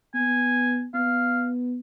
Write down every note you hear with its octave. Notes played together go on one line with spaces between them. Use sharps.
B3 G#5
B3 F5